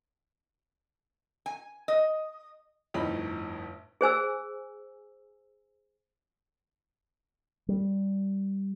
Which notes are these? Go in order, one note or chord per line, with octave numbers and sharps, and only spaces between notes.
G#5
D#5
G1 F2 A2 D#4 D#5 B5
G#4 C5 G#5 E6
G3